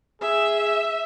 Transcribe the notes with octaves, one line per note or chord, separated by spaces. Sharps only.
G#4 E5